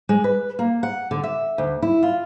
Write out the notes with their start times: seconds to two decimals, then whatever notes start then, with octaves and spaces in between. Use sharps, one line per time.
0.09 G#3
0.24 B4
0.59 A#3
0.83 F#5
1.11 D3
1.23 E5
1.58 D2
1.82 E4
2.03 F4